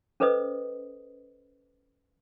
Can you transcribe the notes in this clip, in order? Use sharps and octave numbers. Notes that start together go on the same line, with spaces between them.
C#4 A4 B4 C5 D#5 D#6